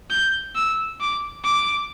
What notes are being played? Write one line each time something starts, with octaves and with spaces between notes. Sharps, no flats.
G6
E6
D6
D6